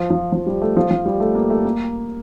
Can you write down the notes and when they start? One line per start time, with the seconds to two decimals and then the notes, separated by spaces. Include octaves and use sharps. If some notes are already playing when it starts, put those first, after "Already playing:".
Already playing: F3
0.10 F3
0.32 F3
0.46 G3
0.62 A3
0.77 F3
0.91 F3
1.06 G3
1.20 A3
1.35 A#3
1.50 A3
1.65 A#3